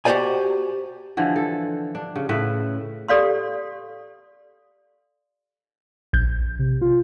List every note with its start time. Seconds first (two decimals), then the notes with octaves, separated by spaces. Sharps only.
0.05 F#4 G4 A4 C5 D5 G#5
1.17 D3 E3 F3
1.36 A4
1.95 D4
2.16 C#3
2.29 A2 C#3 B4 E5
3.08 G4 A4 D5 F5 C6
6.13 A#1 G6
6.59 C3
6.82 F4